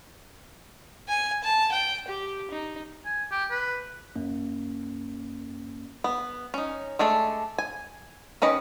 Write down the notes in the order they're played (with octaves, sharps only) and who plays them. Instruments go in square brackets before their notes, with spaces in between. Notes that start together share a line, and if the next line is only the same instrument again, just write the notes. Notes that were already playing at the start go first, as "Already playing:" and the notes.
[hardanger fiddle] G#5
A5
G5
G4
D#4
[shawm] G#5
G4
B4
[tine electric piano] F#2 A#3 C#4
[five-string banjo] B3
C#4 D#4
G#3 A3 D4 A4
G#5
D#3 C#4 B4 D#5